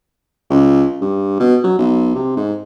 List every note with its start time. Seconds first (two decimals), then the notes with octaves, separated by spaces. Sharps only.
0.50 C#2
1.02 G2
1.40 B2
1.64 F#3
1.79 B1
2.15 C3
2.37 G#2